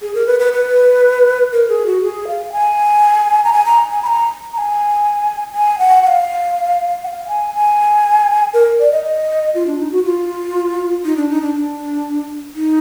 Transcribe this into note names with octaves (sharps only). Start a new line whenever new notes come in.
G#4
A#4
B4
B4
B4
A#4
G#4
F#4
G#4
F5
G#5
A#5
G#5
A#5
G#5
B5
A#5
A#5
G#5
G#5
F#5
F#5
F5
F#5
F5
G#5
G#5
A#4
D5
D#5
D#5
F4
D4
D#4
F#4
F4
D#4
D4
D#4
D4
D4
D#4